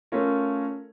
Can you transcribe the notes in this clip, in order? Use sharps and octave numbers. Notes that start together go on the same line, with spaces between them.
A3 C#4 F4 A#4 C#5